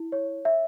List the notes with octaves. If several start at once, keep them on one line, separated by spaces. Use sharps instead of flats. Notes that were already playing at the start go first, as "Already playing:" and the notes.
Already playing: E4
C#5
E5